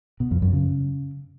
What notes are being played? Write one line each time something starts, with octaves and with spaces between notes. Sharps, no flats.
B2
F2
F#2
C#3